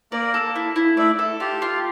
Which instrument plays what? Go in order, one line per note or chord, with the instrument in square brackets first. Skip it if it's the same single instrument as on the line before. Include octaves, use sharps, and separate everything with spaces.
[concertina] A#3 A#4 [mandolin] D5
[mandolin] A4
E4
E4
[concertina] A3 A4 [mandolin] D5
[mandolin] A4
[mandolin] F4 [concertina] G4
[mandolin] F4